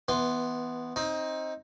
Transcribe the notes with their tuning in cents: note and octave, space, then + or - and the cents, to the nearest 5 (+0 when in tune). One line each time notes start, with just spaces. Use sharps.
E3 -20 B3 +0 C6 -5
C4 +25 D#4 +15